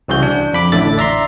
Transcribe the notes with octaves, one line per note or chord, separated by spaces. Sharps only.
C2 C#3 E3 F#4 G6
D4
F2 B5 D6
A1 A2 D3 E5 A6
D5 E5 A#5 C6